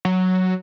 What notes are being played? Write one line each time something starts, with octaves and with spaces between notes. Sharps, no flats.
F#3